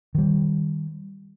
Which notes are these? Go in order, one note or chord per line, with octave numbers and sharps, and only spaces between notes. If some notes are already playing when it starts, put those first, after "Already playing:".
D#3 G3